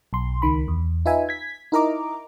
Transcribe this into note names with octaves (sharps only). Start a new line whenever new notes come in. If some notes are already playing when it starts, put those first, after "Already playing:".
B1 C6
C#2 D#3 B5
E2
D#4 F4 B4 E5 G#5
G#6 B6
D#4 E4 A#4 D#5 A#5 D6